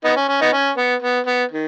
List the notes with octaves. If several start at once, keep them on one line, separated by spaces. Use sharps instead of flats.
B3 D#4
C#4
C#4
B3 D#4
C#4
B3
B3
B3
D#3